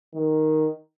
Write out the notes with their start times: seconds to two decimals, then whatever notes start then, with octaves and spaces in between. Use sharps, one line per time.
0.15 D#3